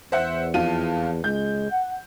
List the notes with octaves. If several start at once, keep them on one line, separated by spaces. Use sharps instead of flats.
E2 C5 E5 F#5
F2 F4 D#7
C#2 G#3 G6
F#5